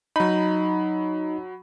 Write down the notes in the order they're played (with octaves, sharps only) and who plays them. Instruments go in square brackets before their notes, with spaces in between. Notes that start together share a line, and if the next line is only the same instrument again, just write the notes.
[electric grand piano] F#3 B5 [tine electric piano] D#4